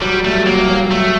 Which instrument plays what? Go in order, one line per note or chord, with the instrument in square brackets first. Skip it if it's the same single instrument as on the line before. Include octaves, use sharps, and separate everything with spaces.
[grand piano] F#3 [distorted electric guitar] G3
[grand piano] G3 [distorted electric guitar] A3
[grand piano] F#3 [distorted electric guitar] A#3
[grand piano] G3
F#3
[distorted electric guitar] A3